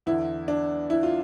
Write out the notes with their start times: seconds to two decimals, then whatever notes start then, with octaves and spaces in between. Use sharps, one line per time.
0.06 E2 D3 E4
0.48 D4
0.90 E4
1.03 F4